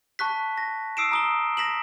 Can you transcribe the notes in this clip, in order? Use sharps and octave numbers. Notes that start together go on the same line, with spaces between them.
A5 C#6 F#6 B6
A#6
D#6 E6 C7 D7 E7
A#5 D#6 G7
A#6 B6 E7 F#7